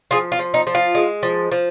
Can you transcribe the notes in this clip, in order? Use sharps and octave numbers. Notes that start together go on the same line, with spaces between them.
F3 F4 G#4
F4
F3
D#4
F3
F4
G#3
F3
F3